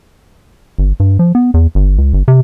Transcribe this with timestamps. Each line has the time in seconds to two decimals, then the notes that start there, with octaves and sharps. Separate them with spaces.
0.78 G1
1.00 G2
1.19 F3
1.35 B3
1.54 E2
1.75 G1
1.98 C#2
2.13 G1
2.28 C3